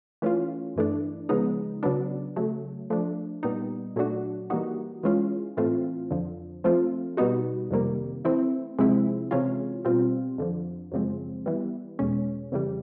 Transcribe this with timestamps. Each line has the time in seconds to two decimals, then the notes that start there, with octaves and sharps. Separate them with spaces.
0.22 E3 A3 C#4 F4
0.76 G2 E3 A3 D4
1.29 C#3 F3 G#3 B3 D#4
1.83 C#3 F#3 B3 D4
2.36 C#3 F#3 A3
2.90 F3 A3 D4
3.43 A#2 G3 B3 D#4
3.96 A#2 F#3 A3 D4 F#4
4.50 E3 G3 A#3 D#4 F#4
5.03 E3 G#3 C#4 F4
5.57 A2 E3 A3 C4 F4
6.11 F2 D3 F3
6.64 F3 A3 C4 F4
7.17 B2 G3 B3 D#4 F#4
7.71 F2 C3 D#3 G3 A#3
8.25 E3 A3 C4 E4
8.78 C3 F3 G#3 C4 E4
9.31 C3 E3 G#3 C#4 F4
9.85 B2 G3 C4 F4
10.38 F2 D3 F3
10.92 F#2 C#3 F3 G#3 C4
11.46 E3 G3 B3
11.99 E2 B2 G#3 C#4
12.52 F2 C#3 E3 G3